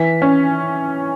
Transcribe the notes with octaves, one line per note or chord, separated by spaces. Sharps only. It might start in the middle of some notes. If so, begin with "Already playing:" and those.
Already playing: E3 B6
C#4